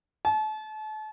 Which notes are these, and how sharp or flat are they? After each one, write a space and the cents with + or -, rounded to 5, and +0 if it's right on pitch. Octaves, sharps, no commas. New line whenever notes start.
A5 -35